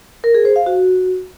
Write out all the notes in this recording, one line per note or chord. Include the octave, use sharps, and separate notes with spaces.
A#4
G#4
C5
F5
F#4